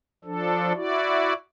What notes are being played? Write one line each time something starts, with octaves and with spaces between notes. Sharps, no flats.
F3 D4 A4
E4 F#4 D5